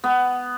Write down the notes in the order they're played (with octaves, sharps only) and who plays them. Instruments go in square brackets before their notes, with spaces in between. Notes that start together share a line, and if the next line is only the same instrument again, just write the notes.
[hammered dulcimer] B3